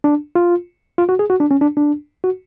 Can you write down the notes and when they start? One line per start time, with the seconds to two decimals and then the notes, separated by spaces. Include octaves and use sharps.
0.04 D4
0.35 F4
0.98 F4
1.09 F#4
1.19 G#4
1.30 F#4
1.40 D4
1.51 C#4
1.61 D4
1.77 D4
2.24 F#4